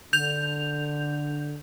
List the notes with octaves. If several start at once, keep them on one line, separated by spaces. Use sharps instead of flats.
D3 G6 F7